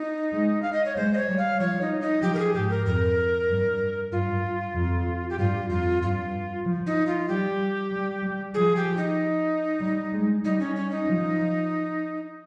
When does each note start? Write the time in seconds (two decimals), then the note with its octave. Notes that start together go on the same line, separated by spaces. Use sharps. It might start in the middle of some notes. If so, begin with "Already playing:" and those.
Already playing: D#4
0.33 G#3
0.62 F5
0.73 D#5
0.85 C#5
0.96 G#3 C5
1.13 D#5
1.17 C#5
1.29 G3
1.38 F5
1.60 F3 C#5
1.81 D#4
2.01 D#4
2.22 F3 G4
2.34 A#4
2.39 G#4
2.54 G#2 G4
2.70 A#4
2.85 F2 A#4
3.49 G2
4.12 G2 F4
4.75 F2
5.30 G4
5.39 G2 F4
5.70 F2 F4
6.02 G2 F4
6.66 F3
6.87 D#4
7.07 F4
7.28 G3 G4
7.91 G3
8.23 G3
8.54 F3 G#4
8.76 G4
8.97 D#4
9.81 G3
10.13 G#3
10.44 G3 D#4
10.60 C#4
10.76 C#4
10.91 D#4
11.07 F3